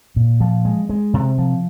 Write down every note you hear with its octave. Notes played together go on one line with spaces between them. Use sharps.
A#2
F3
G#3
G#3
C3
F3